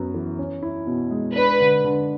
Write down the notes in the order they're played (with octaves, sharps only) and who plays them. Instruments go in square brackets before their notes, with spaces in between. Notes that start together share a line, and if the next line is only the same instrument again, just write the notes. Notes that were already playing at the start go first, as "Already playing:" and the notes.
Already playing: [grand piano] F#2 B3 F#4
E3
C#4
E4
B2
G#3
[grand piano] D4 [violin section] B4
[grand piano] D3
D3